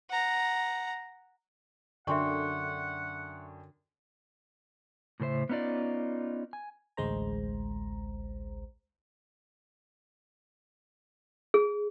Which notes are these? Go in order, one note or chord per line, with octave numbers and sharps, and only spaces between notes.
F#5 A#5
F#2 D3 D4 E5 F#5 G5 C6 C#6
A2 C#3 A4 C5 E5
B3 C#4 D#4 F4 D5
G#5
A1 D2 G#3 C5 A#5
G#4